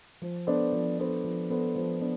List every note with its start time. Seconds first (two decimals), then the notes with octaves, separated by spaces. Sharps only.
0.22 F3
0.47 B3 D4 A4 C5
0.73 F3
0.99 B3 D4 A4 C5
1.24 F3
1.50 B3 D4 A4 C5
1.76 F3
2.01 B3 D4